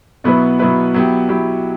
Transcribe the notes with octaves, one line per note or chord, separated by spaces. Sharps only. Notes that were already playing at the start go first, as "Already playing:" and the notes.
B2 F#3 B3 E4 B4
B2 F#3 B3 E4 B4
F#3 B3 E4 G4
F#3 B3 E4 G4